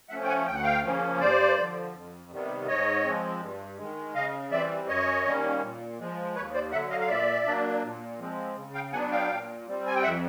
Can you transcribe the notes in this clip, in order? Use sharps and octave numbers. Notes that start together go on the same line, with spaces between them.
F3 A3 C#4 E5 F#5
G5
F#5 G#5
D2 G5
F#5
F5 G5
C#3 F3 A#3 C#4
G2 C5 D5
D3 F3
F2
C3 D#3 G3 B3
G#2 C#5 D#5
F3 G#3 C4
G2
D#3 G#3
C#3 D#5 F5
E3 G3 C4 D5 E5
F#2 C#5 D#5
D#3 G3 A#3 C#4
A#2
F3 G#3
D#2 B4 C#5
C5 D5
D3 F#3 E5 F#5
D#5 F5
F5
A#2 D5 E5
F#3 A#3 D4
A#2
F3 G#3 C4
C#3
F5 G5
F#3 B3 D4 F#5 G#5
F5 G5
A#2
G3 C4
G#5
G5
F2 E5 F#5